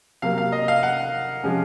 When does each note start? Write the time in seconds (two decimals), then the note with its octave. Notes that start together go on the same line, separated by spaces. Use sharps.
0.22 C3 F#3 A#3 F5
0.38 F5
0.52 D#5
0.68 F5
0.83 F#5
1.44 C3 F3 G#3 C#4